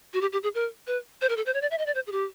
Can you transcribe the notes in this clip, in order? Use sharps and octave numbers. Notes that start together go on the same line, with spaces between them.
F#4
G4
G4
G#4
A#4
B4
C5
A#4
A4
C5
C#5
D5
E5
D#5
D5
C5
G#4
G4